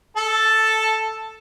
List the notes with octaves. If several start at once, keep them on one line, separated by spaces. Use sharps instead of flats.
A4 A5